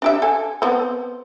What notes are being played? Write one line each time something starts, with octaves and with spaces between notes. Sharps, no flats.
D4 G4 E5
A4 G#5
B3 C4